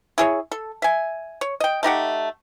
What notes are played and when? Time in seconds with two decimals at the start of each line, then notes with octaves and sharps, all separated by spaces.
0.18 E4 G#4 C#5
0.52 A4
0.82 E5 G#5
1.41 C#5
1.60 D#5 G5
1.83 A3 D#4 G4 F#5